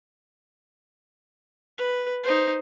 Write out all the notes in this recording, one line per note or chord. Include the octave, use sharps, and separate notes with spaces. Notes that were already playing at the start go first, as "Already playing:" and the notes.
B4
D#4 C5